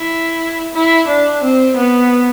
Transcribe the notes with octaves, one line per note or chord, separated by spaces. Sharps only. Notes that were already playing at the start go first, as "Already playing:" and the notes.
Already playing: E4
E4
D4
C4
B3